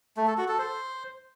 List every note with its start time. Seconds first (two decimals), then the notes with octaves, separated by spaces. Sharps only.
0.17 A3
0.27 A4
0.38 F#4
0.48 A4
0.59 C5